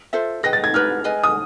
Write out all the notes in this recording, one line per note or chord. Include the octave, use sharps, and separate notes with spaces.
F4 A4 C5 E5
G#4 B4 D#5 G5 A#6
A6
G#6
D#4 G4 B4 F6
G#4 B4 D#5 G#5
D#6